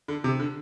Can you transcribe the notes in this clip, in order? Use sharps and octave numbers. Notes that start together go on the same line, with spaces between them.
D3
C3
D3